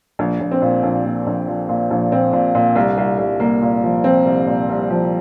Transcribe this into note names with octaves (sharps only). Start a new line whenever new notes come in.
A#1
A#1
C4
A#2
A#1
A#2
A#1
F3
A#2
A#1
A#2 C4
A#2
A#2
C2
C2
C2
C2 A#3
A#2
F3
F3 C4
C2
A#2
C2
F3